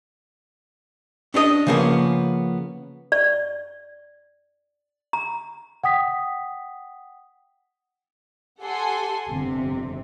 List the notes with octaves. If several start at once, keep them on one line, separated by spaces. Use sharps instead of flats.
C#4 D4 E4 D#5
C#3 F3 A#3 B3 C#4
D5
A#5
F#5 G5 D#6 B6
G4 A4 F#5 G#5 C6
G1 F2 C3